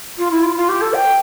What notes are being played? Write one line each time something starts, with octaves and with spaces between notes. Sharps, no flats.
F4
E4
F4
F4
G4
A4
G5